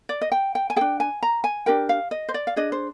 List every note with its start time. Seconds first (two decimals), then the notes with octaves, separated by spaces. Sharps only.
0.09 D5
0.21 D#5
0.32 G5
0.55 G5
0.70 G#5
0.76 D4 G#4 G5
1.00 G#5
1.23 A#5
1.44 G#5
1.66 D4 G4 A#4 G5
1.89 F5
2.11 D#5
2.29 C5
2.34 D5
2.47 F5
2.56 D4 G#4 D#5
2.72 C5